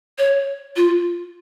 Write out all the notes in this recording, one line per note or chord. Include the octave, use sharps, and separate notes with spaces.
C#5
F4